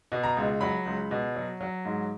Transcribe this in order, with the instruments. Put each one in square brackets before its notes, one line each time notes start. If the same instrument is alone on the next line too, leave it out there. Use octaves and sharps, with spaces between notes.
[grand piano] B2
A#5
C#2
F#3 B5
C#2
B2
F#3
F#3
G#2